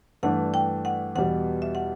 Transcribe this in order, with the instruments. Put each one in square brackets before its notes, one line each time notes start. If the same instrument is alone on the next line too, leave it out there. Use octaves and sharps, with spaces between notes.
[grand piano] G2 E3 A3 D4 [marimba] F#5
[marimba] G5
F#5
[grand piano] E2 B2 G3 [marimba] F#5
[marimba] E5
F#5